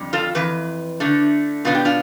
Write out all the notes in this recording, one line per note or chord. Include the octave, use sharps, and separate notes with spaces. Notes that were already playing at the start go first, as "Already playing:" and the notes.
Already playing: F2 D3 G3
F4 A4
F2 E3 B4
D3 A3 D4
B2 B3 D4 F4
G4
D4 F4